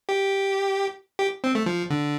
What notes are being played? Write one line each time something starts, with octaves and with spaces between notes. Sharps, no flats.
G4
G4
C4
A3
F3
D3